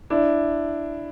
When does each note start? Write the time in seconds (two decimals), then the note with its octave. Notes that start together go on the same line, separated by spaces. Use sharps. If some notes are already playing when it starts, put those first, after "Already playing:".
0.10 D4 E4